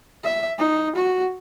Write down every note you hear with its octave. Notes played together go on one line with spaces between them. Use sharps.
E5
D#4
F#4